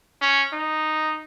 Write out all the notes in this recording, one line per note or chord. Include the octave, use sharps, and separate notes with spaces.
C#4
D#4